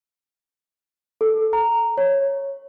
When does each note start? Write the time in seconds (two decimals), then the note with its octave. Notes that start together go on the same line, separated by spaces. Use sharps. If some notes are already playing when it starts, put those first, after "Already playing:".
1.21 A4
1.53 A#5
1.98 C#5